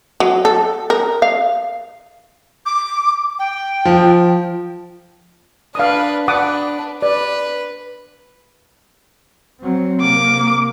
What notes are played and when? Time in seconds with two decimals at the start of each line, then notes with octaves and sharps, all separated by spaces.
0.20 F#3
0.45 A4
0.90 A#4
1.22 F5
2.66 D6
3.39 G5
3.85 F3
5.75 D4 B4 F5 D#6
6.28 D4 B4 F#5 D6 D#6
7.02 B4 D5
9.60 F#3 C4
10.01 C3 A#3 D6